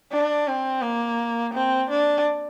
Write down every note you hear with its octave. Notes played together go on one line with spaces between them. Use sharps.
D4
C4
A#3
C4
D4